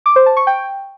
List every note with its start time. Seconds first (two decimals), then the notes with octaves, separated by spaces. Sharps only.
0.06 D6
0.16 C5
0.26 A5
0.37 C#6
0.47 G5